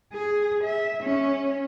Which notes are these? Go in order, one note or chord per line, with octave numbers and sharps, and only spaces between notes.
G#4
E5
C#4